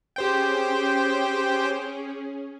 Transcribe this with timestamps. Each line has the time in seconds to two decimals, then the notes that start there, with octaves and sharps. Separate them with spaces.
0.16 C#4 G4 G#4 C5 G5